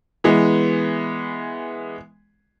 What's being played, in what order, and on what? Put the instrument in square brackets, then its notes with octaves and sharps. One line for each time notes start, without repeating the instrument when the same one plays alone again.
[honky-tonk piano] E3 G#3 B3